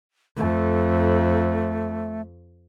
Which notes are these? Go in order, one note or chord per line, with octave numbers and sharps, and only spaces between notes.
F2 A3